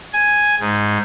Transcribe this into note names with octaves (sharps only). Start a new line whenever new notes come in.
G#5
G#2